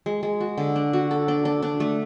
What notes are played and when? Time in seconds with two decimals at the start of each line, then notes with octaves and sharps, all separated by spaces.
0.06 G#3
0.23 G#3
0.40 F#4
0.58 D3
0.76 D4
0.93 F#4
1.11 A4
1.28 D4
1.45 D4
1.63 D4
1.80 A3